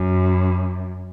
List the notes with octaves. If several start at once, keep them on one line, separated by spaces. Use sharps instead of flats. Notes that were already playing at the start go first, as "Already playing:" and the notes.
Already playing: F#2